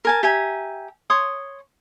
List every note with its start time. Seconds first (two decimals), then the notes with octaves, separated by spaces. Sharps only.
0.05 A#4 G#5 A5
0.23 G4 E5 G#5 A#5
1.10 C#5 C6 D#6